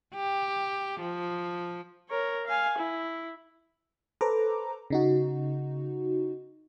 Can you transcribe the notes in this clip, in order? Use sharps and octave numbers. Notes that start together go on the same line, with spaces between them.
G4
F3
A#4 C#5
F5 G#5
E4
A4 B4 C5 A#5 D6
C#3 D#4 F#4